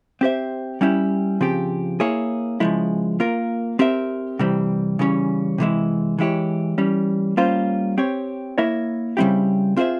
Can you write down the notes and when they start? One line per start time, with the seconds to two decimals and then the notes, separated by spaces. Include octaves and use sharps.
0.21 C4 G4 C5 E5
0.81 G3 C#4 E4 G4
1.41 C#3 F3 C4 G4
2.00 A#3 E4 G#4 C#5
2.60 C#3 F3 G#3 E4
3.20 A#3 F4 A#4
3.79 C4 G4 A#4 E5
4.39 C3 E3 G3 C4
4.99 C#3 E3 G3 C#4
5.58 C3 E3 G#3 E4
6.19 E3 G#3 E4 G4 C#5
6.78 E3 G3 C#4
7.37 G3 A#3 C#4 F4 C5
7.98 C4 G4 C#5
8.58 A#3 E4 A#4 C#5 E5
9.17 C#3 G3 C4 E4 G4
9.76 C4 F4 G#4 C5 E5